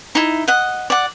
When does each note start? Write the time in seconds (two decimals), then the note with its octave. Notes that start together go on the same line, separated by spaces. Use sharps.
0.15 D#4 E4
0.48 D#5 F#5
0.90 D5 F#5